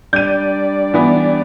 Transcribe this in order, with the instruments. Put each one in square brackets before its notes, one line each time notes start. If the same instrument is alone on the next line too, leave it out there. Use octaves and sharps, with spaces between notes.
[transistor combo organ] G3 D4 D5 [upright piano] G6 D#7
[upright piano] E3 B3